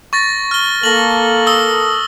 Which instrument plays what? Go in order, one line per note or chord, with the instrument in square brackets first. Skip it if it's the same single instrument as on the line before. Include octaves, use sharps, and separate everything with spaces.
[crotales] C#6 A6 A#6
F6 G7
[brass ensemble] A#3 A4 [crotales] A#6 F#7
[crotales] D#6 E6 G7